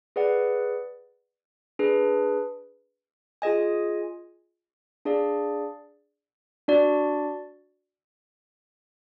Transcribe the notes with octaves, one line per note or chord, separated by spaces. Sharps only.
G#4 B4 D5 F#5
D4 G#4 B4
F4 G#4 D#5 G#5
D4 G#4 D5 F5
D4 F#4 D5